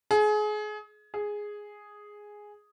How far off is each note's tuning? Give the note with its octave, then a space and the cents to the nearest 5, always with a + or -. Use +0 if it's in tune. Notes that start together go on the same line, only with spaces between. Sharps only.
G#4 +30
G#4 +0